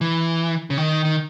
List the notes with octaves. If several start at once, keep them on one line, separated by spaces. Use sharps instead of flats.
E3
C#3
D#3
D#3